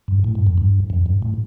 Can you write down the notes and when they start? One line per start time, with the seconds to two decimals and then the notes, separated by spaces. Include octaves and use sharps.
0.08 G2
0.24 A2
0.35 G2
0.47 F2
0.58 G2
0.90 F2
1.06 G2
1.22 A2